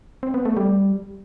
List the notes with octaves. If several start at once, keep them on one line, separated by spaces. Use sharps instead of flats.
C4
B3
A3
G3